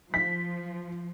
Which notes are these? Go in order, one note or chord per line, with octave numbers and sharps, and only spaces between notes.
F3 B6